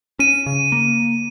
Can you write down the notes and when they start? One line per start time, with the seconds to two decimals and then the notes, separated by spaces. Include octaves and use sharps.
0.19 C#4 D#7
0.46 C#3
0.72 A#3